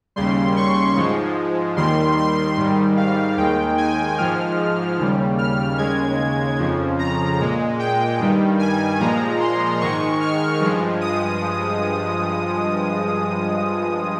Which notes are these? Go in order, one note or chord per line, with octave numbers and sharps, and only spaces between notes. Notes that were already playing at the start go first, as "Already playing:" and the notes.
D#2 C#3 G3 C6
C#6
G#2 F3 G#3
D#2 D#3 G3 C6
C6
G#2 D#3 G3
F5
D#2 D#3 G#3 G5
G#5
G#2 F3 G#3 F6
D#2 C#3 G3
F6
D#2 C#3 G#3 G#6
F2 C#3 F3
A#5
A#2 G#3
G5
G2 D#3 G3
G#5
A#2 F3 G#3 A#5
C6
G#2 D#3 G#3 C#6
F6
G2 F3 G#3
D#6